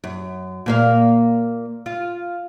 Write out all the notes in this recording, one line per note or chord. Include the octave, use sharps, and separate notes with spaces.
F#2
A#2 A#3 F5
F4